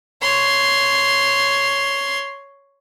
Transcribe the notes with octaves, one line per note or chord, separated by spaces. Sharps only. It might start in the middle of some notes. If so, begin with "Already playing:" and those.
C#5 C6